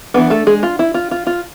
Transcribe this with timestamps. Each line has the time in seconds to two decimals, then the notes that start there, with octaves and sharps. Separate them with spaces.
0.14 E3 G#3 B3 D4 B4
0.30 A3 A4
0.47 G#3 G#4
0.63 F4
0.79 E4
0.94 F4
1.11 F4
1.27 F4